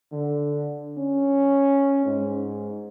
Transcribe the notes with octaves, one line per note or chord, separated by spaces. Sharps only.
D3
C#4
G#2